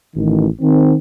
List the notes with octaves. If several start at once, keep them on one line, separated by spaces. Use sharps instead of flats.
A1 D#3
D#3 C4